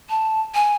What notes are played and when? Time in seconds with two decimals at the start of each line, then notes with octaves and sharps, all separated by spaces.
0.10 A5
0.55 G#5